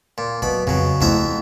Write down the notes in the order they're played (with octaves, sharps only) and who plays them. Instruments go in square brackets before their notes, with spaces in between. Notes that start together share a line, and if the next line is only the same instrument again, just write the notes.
[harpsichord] A#2
[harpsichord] B2 B5 [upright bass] F#3
[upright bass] F2 [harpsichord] C#3 F#3
[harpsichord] F2 E5 A#5 [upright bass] A3 E4